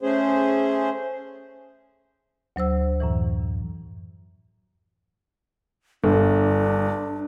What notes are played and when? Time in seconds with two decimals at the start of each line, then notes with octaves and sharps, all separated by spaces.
0.02 A3 C#4 G#4 C5
2.56 D2 F#3 C5 E6
3.00 F#2 A2 E3
6.04 G1 D4